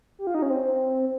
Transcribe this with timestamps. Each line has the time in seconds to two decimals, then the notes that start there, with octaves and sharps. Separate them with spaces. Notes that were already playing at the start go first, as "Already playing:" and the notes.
0.19 G4
0.27 F4
0.35 D#4
0.42 C#4
0.50 C4